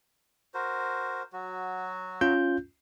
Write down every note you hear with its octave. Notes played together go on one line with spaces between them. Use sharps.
F#4 A#4 C5
F#3 F#4
C#4 F4 G6